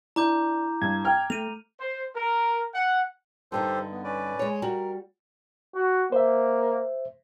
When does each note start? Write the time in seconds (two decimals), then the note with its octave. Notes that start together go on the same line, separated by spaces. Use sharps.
0.16 D4 E4 A#5 D6 G6
0.82 G2 G#6
1.05 G5 A#5 F6
1.30 A3 D#7 F7
1.80 C5
2.16 A#4
2.74 F#5
3.52 G2 D3 D#4 G4 A4 C5
3.92 B3
4.04 C#4 B4 D5
4.39 G#3 C#5
4.62 G3 F#4 A#4
5.75 F#4
6.12 A#3 C5 E5